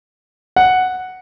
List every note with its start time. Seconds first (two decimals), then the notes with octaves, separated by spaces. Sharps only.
0.56 F#5